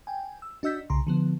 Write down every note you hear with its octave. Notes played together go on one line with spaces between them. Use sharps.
G5 G#5
E6
D4 F#4 D#5 E6 G6 B6
C2 C#3 A#5 C6
D3 F3 B3